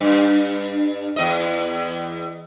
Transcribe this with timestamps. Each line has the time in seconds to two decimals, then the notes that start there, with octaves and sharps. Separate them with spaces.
0.01 G2
1.16 E2 D#5